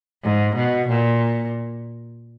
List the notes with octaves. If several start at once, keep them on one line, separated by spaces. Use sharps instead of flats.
G#2
B2
A#2